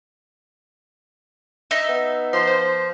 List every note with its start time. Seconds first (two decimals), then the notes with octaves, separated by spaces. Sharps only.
1.71 D#4 E5
1.89 B3
2.33 F3 C6
2.47 C5